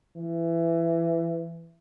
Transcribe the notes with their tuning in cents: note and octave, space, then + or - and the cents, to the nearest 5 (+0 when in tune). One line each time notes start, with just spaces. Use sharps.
E3 +20